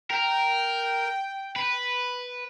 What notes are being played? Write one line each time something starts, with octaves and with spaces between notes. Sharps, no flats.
A#4 G5
B4